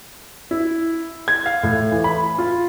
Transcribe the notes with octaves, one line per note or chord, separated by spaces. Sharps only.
E4
G#6
F5
A2
E3
B5
F4